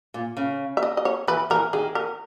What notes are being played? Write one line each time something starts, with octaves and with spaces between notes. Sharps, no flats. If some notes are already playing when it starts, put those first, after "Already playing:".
A#2
C#3
E5
D#5
D#5
C#5
E3 B4
E3 A#4
D#3 G#4
A#4